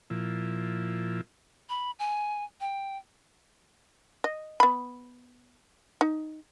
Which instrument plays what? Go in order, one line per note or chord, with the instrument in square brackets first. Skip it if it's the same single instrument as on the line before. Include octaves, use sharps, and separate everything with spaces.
[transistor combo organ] A#2 F3 E4
[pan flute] B5
G#5
G5
[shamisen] D#5
B3 B5
D#4